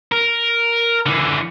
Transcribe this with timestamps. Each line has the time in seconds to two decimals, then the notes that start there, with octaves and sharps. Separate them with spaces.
0.12 A#4
1.06 D3 E3